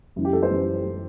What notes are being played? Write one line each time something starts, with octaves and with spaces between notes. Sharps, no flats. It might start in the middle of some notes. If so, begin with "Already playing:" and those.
F#2 E3
G4
A4
C5
F#2 E3
E3